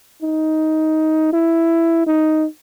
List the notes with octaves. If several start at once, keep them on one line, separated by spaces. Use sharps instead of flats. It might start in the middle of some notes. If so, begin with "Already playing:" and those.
D#4
E4
D#4